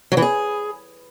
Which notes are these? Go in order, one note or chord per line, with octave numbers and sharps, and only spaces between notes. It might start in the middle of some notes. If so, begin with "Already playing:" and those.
F#3
E3
G#4